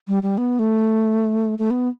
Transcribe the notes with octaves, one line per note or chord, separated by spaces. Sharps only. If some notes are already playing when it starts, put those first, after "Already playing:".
G3
G3
B3
A3
A3
B3